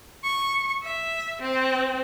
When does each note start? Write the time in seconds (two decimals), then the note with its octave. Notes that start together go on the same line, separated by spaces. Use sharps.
0.24 C#6
0.83 E5
1.41 C4